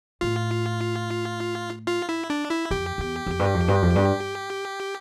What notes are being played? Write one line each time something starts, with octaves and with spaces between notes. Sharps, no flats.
A2 F4
F4
E4
D4
E4
F2 G4
E2
F2
G2
F2
G2
F2
G2